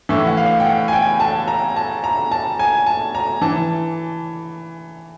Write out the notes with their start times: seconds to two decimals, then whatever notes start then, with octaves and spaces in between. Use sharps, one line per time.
0.09 A2 E3 E5
0.27 F#5
0.37 F5
0.60 G5
0.65 F#5
0.88 G#5
0.93 G5
1.20 A5
1.48 A#5
1.76 A5
2.04 A#5
2.32 A5
2.59 G#5
2.86 A5
3.15 A#5
3.42 E3 A5